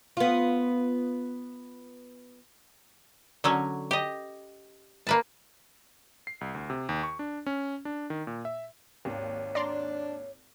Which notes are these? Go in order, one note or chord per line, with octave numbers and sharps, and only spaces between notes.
B3 F4
D3 F#3 C#4 F#4 C#5
G4 D#5
A#3 B4 A5
C7
C2
D2
C3
D#2
C#6
D4
C#4
D4
D#3
A#2
E5
G#1 D#2 C#5
D4 D5 A#5 C6